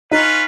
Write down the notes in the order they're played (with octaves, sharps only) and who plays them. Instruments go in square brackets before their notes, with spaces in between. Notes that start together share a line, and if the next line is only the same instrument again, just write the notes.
[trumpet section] C#4 F4 B4 [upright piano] D#4